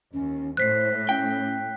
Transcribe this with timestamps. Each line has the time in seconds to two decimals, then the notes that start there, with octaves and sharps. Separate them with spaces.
0.13 D#2 C#4
0.57 A2 C5 F#6 B6 C7
1.09 C#4 G5